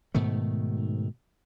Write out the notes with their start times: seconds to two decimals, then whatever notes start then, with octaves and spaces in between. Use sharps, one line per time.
0.15 G#2 B2 D#3 A3